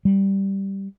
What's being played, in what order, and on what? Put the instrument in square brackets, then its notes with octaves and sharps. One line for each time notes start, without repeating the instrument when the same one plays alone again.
[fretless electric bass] G3